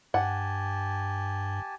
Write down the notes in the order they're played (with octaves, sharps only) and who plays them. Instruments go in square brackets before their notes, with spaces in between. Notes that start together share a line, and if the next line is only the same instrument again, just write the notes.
[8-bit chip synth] G2 [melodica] G4 G#5 A5 [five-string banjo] F#5